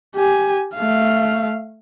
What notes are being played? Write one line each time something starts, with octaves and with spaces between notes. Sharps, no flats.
G4 G#5
A3 F5